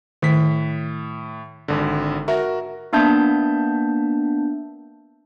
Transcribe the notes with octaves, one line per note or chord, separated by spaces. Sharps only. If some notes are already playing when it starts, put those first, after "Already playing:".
A2 D#3 B6
G#1 D3
F#4 A#4 E5
A#3 B3 D4 E5 A5 G6